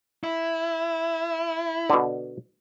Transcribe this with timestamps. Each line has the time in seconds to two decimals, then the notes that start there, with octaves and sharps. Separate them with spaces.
0.24 E4
1.90 B2 D3